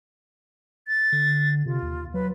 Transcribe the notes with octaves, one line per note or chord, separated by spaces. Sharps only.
A6
D3
C3 F4
D#2
F#3 B4